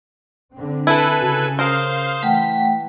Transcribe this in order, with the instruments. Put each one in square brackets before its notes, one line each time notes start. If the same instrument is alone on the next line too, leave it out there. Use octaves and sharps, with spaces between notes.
[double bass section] D3 C4
[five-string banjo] E4 [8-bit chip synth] A4 B4 G#5
[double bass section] C#3 [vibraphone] F#4
[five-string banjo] A#4 [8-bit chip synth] C5 F5 [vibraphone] D#6
[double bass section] E3 [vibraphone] A3 F#5 G5 [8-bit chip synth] B6